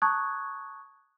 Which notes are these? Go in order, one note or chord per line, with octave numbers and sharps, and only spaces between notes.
A5 A#5 C#6 D#6 F#6 G#6